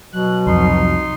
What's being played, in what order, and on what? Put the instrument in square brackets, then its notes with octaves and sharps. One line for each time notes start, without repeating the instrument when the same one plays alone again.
[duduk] B2 [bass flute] F#3 [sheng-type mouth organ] F#6
[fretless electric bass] C2 F2 [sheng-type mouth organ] D#4 C6